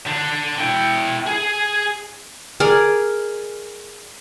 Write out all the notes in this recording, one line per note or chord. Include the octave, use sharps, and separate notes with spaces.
D3 D4
E4 G5
G#4
G#4 A#4 D5